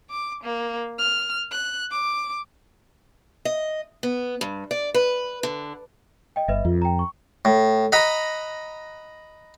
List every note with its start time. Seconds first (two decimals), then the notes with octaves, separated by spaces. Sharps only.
0.10 D6
0.44 A#3
0.99 F6
1.51 F#6
1.91 D6
3.45 D#5
4.03 B3
4.41 G2
4.71 D5
4.94 B4
5.43 D3
6.36 D#5 G5
6.48 G1 B4 D#5 E5
6.65 F2 F4
6.82 G5 A#5
6.99 C#6
7.45 A2
7.92 D#5 F#5 A#5 B5